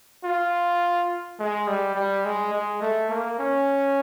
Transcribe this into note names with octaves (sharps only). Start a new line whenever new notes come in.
F4
G#3
G3
G3
G#3
G#3
A3
A#3
C#4